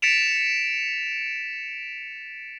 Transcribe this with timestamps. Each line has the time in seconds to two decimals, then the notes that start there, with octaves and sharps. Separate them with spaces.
0.02 A6 B6 C#7 D7 E7 F7